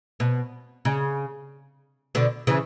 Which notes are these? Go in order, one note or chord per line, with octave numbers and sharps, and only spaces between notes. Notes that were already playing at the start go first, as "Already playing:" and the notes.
B2
C#3
B2 D3
C#3 E3